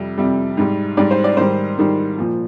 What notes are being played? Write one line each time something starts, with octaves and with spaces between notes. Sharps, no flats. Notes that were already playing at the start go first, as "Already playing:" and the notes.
Already playing: F2 C3 G3
F2 C3 G3
G#2 G3
G#2 G3 D5
C5
D5
G#2 D#3 G3 C5
G#2 D#3 G3
A#2 F3